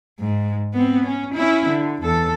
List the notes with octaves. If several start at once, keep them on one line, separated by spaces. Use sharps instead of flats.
G#2
B3 C4
C#4
C#4 E4
D3
E2 A4